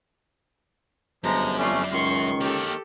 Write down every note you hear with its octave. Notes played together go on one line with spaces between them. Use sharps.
G1 F#2 F3 G#3 A#5
F2 A3 C#4 F4 D5
C#2 D#3 C6 C#6
A#3 G4 A4 C#5